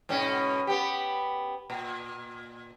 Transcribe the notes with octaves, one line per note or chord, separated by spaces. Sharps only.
G#2 B2 C#4
B3 G4
A#2